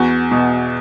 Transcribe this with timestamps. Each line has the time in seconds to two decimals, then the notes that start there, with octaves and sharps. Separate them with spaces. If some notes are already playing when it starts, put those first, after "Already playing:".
Already playing: E2 F#4
0.32 B2